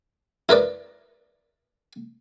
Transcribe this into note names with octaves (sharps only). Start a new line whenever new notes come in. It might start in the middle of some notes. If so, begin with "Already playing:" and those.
E4 A#4 B4 D5